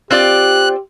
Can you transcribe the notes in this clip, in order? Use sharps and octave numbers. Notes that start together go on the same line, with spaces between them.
C4 F4 G4 D5 F#6